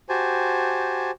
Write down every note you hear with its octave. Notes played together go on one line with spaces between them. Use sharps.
F#4 G4 C5 G#5 A5